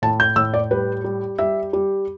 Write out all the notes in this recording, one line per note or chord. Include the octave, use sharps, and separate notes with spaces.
A2 A5
G6
A2 E6
D5
G3 B4
G3
G3 E5
G3